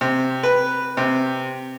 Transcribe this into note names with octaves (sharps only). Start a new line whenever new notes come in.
C3
B4
C3